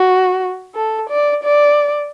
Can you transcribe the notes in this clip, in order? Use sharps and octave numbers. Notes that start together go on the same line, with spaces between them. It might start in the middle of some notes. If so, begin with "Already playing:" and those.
Already playing: F#4
A4
D5
D5